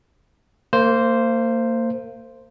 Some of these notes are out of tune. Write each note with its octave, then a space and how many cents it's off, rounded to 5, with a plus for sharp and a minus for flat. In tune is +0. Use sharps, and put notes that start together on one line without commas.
A#3 -30 C5 +0